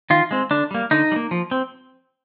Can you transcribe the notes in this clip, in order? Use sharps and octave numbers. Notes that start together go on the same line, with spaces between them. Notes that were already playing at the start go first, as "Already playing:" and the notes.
D#3 F4
G#3 C4
D3 D4
G3 A#3
D3 D#4
G3
A#3
F3
C4